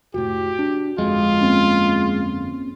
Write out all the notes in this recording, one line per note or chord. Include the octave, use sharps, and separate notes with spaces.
F1 A2 F#4 G4
D4
G1 F2 G#3 F4
A#3 C4 C#4